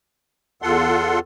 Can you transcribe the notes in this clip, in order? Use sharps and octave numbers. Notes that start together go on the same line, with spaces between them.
E2 F4 A4 F#5 C6